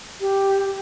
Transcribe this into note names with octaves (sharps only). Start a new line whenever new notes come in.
G4